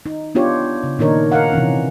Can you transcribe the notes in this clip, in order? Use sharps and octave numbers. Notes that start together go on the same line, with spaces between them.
D#4
B3 D4 F4 G4 C#5
C#3
A#2 D#3 D4 D#4 A#4 C#5
A#4 F5 F#5
C3 E3 C#4